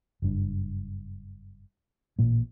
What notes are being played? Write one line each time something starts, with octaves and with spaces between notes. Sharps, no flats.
F#1 G2
A1 A#2 A#3